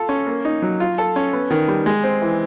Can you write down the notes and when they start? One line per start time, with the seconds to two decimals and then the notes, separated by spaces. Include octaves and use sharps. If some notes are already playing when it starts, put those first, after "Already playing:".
Already playing: F4 A4
0.09 C#4
0.27 A#3
0.45 D#4
0.62 F#3
0.80 F4
0.98 A4
1.16 C#4
1.33 B3
1.51 D#3
1.68 G3
1.86 G#3
2.04 C4
2.22 E3